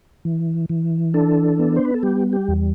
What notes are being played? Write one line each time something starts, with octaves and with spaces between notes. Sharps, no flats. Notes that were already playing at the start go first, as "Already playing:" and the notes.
E3
E3
D4 A4
B3
C5
B4
A4
G3 G4
G4
E2